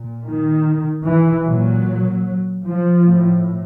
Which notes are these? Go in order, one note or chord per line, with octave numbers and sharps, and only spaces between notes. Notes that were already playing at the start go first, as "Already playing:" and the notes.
Already playing: A#2
D#3
E3
A#2 F#3
F3
A2